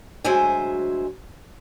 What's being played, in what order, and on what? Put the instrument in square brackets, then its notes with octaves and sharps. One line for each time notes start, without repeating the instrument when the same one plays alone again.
[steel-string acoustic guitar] D2 F#3 G#3 C5 E5 G#5